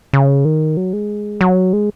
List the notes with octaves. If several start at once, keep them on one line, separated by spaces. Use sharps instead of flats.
C#3
D#3
F#3
G#3
F#3
G#3